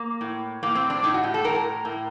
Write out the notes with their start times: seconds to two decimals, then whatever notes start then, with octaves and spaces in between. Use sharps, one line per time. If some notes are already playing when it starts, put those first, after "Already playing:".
Already playing: A#3
0.21 A2
0.63 A2 A#3
0.75 C4
0.90 D4
1.03 A2 D#4
1.14 F#4
1.24 G4
1.34 A4
1.44 A2 A#4
1.85 A2